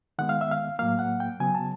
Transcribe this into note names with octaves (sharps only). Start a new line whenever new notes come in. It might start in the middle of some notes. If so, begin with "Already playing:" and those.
D#3 G#3 B3 F#5
F5
E5
F5
A2 F#3 A#3 F5
F#5
G5
C#3 F#3 B3 G#5
A5